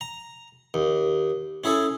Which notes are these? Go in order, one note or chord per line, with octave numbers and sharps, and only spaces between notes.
A#5
D#2
C#4 E4 G#4 A4